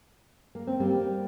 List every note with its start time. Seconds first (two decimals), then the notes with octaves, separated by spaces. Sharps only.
0.55 A#3
0.67 C4
0.80 G3 A#3